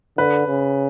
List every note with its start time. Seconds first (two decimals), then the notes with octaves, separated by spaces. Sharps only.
0.18 D3 B4
0.47 C#3